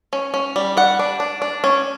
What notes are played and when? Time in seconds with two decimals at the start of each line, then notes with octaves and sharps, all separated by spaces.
0.13 C#4
0.34 C#4
0.56 G3
0.77 G3 F#5
0.99 D4
1.20 D4
1.42 D4
1.64 C#4